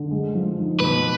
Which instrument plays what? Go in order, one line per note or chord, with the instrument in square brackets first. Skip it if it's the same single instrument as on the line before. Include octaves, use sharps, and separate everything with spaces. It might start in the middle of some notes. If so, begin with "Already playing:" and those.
Already playing: [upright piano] D3
G#3
F3
D#4
[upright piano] B2 [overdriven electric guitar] B4